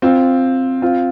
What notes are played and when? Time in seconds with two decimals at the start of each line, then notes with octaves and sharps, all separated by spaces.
0.02 C4 F4
0.82 C4 F4